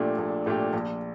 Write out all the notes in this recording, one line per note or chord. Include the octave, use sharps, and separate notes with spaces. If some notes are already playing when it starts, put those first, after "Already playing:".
Already playing: A#1 A#2 A3 D4 G4
A#1
A#2 A3 D4 G4
A#1